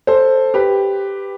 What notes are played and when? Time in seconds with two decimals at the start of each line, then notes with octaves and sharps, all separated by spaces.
0.07 A4 C5
0.54 G4 B4